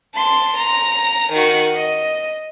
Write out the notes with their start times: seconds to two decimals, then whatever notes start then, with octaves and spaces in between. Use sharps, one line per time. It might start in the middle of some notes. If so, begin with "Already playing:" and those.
0.16 A5 C6
0.58 A#5
1.32 D#3 F#4
1.72 D#5